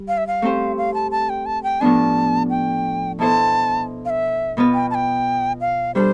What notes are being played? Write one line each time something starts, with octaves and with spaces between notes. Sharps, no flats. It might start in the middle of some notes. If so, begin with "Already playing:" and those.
Already playing: G3
F5
E5
F5
A3 C4 G4 C5
F5
A5
A5
G5
A5
G5
A2 F3 B3 D4 A5
G5
B2 B3 E4 A4 C5 A5
F5
E5
B2 B3 F4 B4
G5
A5
G5
F5
G3 D4 A4 C5